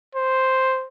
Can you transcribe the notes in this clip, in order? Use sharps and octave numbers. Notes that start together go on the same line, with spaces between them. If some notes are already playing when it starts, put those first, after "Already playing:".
C5